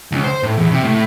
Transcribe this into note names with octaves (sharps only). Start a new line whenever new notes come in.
C#2
C5
A2
E2
C3
A2